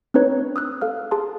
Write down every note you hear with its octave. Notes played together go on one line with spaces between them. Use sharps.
C4 D4 D#4 B4 C#5
D#6 E6 F#6
A4 F5 F6
G#4 A5 C6